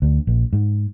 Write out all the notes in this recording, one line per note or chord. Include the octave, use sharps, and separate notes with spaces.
D2
A#1
G#2